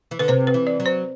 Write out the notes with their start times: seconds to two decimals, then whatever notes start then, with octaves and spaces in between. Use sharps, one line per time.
0.11 E3
0.19 D3 B4
0.28 C3 C5
0.47 B4
0.54 E3
0.67 D5
0.80 F#3
0.86 C5